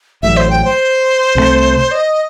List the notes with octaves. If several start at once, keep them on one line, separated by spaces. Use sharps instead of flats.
A1 A2 F#3 E5
C5
G5
C5
C2 C3 D#3 A3
D#5